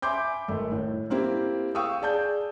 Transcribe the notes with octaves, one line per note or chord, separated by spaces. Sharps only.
E5 G#5 B5 C6 D6 G6
G#1 A3
A2
A#3 C4 E4 G4
F5 G5 C#6 D#6 E6
G#4 D5 A5 G6